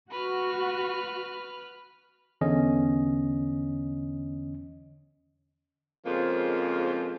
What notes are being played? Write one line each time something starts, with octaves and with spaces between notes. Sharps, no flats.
F#4 B4 F6
E2 D3 C#4 D#5
F2 C#3 F3 G#3 A#3 F4